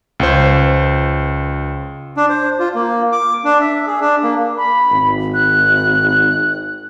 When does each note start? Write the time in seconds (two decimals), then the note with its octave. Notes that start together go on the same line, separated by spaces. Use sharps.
0.20 C#2 C5
2.17 D4
2.29 C5
2.59 F4
2.75 A#3
3.12 D6
3.44 D4
3.61 E5
3.87 G#4
4.01 D4
4.23 A#3
4.57 B5
4.91 G#1
5.34 F#6